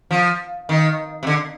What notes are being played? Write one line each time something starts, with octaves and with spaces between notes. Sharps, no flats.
F3
D#3
C3
D3